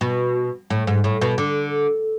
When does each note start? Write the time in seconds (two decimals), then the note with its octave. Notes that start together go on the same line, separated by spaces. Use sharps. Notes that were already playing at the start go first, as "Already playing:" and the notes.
0.01 B2
0.70 A2
0.87 G#2
1.04 A2
1.21 B2
1.38 D3